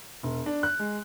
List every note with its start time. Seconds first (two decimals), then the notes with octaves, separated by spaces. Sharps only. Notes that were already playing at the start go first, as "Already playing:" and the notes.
0.23 E1
0.46 D4
0.63 F#6
0.79 G#3